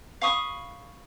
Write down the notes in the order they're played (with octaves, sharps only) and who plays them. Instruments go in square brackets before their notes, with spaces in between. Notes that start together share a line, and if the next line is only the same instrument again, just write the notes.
[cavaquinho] F5 B5 C#6 D#6